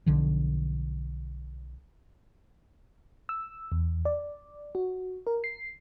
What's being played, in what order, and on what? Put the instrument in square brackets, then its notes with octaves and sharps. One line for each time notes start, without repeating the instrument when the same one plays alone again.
[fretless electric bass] B1 D3 F3
[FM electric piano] E6
E2
D5
F#4
A#4
C7